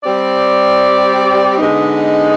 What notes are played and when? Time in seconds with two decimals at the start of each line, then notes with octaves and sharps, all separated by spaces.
0.04 G3 C4 G4 D5
1.58 D3 G#3 B3 D#4